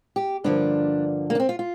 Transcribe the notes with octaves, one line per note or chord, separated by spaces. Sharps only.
G4
G2 D3 F3 A#3 D4
A#3
D4
C4
F4
F4